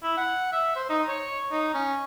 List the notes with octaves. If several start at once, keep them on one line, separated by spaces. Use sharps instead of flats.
E4
F#5
E5
C5
D#4
C#5
D#4
C#4